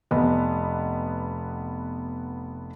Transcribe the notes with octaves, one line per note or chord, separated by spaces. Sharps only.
F1 B3 D#5